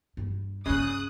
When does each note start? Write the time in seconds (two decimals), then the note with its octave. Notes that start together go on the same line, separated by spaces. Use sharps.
0.17 G2 G3
0.66 G1 C#3 C#4 D#6 F#6